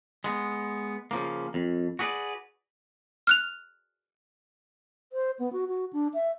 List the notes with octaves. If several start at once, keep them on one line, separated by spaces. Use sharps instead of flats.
G#3 B3
C#3 F3 A#3
F2
F#4 G#4 B4 C5 D5
F6 F#6 F7
C5
B3
F#4
F#4
D4
E5